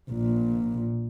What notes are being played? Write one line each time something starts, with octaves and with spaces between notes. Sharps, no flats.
A#1 A#2